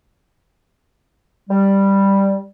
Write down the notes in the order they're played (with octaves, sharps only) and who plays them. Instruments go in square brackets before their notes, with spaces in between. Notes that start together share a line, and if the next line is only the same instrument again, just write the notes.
[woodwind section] G3